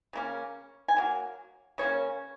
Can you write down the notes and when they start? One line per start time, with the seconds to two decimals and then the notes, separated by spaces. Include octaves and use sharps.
0.13 C#3 A#3 C#4
0.88 G#5
0.97 F#3 A#3
1.78 C#3 A#3 C#4 C#5